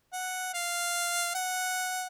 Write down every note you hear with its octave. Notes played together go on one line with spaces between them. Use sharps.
F#5
F5
F#5